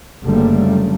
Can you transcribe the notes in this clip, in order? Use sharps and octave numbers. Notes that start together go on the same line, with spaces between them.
F#1 D3 G3 A3 A#3